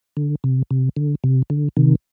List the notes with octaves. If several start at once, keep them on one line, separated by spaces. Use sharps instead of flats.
D3
C3
C3
D3
C3
D3
C3 D#3